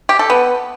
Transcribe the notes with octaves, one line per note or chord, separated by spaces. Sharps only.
G4
A4
B3